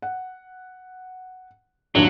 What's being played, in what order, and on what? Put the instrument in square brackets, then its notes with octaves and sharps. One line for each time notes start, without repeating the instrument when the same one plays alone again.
[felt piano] F#5
[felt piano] A1 D#2 [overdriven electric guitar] F#3 [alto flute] D4